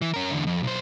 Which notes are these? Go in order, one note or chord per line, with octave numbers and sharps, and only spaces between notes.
E3
C#4 A#4
E2 D3
F2
B1 C5